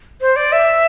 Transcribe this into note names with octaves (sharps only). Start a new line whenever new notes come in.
C5
D5
E5